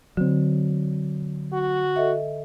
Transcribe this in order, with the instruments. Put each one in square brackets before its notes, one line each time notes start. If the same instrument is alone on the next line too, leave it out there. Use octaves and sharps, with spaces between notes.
[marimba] D3 [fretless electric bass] F#3 C4
[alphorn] F#4
[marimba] A4 D#5 E5